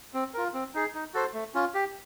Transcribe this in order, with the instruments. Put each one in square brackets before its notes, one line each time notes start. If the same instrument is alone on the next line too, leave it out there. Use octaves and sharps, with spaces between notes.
[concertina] C4
F4 A#4
C4
D#4 G#4
D#4
F#4 A4 C5
A3
C#4 F4
G4